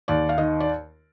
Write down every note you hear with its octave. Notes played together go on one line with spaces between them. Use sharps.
D#2 D5
F5
D#3 D#5
D5